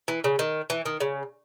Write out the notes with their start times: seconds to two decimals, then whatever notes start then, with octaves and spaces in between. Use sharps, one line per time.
0.08 E3
0.24 C#3
0.39 D#3
0.70 E3
0.86 D#3
1.00 C#3